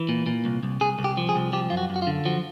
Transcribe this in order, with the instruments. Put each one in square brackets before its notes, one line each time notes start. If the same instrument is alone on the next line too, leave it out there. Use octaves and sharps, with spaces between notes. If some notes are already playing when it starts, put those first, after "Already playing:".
Already playing: [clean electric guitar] E3
A#2
A#2
C2
C2
C2 G#4
C2
G4
F3
G#4
C2
F3 G4
F#2 F4
F#4
F#2
F#4
F4
D3
F3 F#4